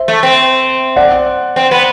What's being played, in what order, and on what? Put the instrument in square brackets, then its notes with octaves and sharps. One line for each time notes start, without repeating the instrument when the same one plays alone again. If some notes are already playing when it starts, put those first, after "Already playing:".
Already playing: [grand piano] C5 E5
[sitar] A3
C4
[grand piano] D5 F#5
[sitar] C4
B3